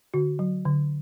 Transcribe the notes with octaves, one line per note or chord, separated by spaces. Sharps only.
D3 F#4
F#3
D3